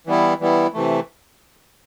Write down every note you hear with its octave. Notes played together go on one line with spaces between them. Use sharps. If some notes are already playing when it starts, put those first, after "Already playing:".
E3 G3 B3 E4
E3 G3 B3 E4
C3 E3 A3